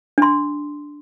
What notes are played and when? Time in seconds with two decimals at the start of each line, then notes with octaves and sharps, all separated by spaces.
0.18 D4 C6